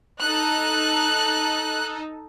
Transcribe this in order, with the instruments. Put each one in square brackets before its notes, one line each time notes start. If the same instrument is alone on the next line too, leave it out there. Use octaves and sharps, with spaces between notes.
[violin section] D#4 A4 F#6